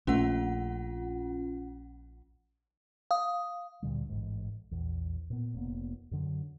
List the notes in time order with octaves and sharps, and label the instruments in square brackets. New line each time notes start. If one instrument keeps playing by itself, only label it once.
[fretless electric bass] A#1 A3 [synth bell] C#4 F4 F#5
[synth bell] F5 D#6
[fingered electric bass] D2 A#2 D3 G3
A1 G#2
A#1 E2
A#2 B3
F1 A#3 B3
F#2 D3 F#3